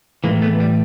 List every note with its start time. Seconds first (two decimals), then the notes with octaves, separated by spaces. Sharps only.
0.24 E3 G#3 A#3
0.27 A2
0.42 A3 B3
0.60 G3